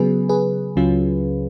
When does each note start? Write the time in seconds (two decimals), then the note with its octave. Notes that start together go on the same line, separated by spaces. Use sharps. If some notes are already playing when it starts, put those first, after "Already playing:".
Already playing: C#3 F#3 B3 G#4 B4
0.29 G#4 B4
0.76 C#2 C#3 F#3 C#4 F4